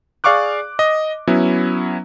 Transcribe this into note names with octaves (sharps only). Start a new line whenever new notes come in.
G#4 D5 F5 C#6 D6 F#6
D#5
F#3 B3 C#4 E4